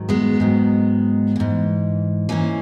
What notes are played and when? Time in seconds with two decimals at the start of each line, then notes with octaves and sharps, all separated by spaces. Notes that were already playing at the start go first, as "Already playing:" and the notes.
Already playing: G#2 D#3 F#3
0.09 G#3 B3
0.40 G#2 D#3 F#3
1.36 G#2 E3
2.29 G#2 E3 A#3 C#4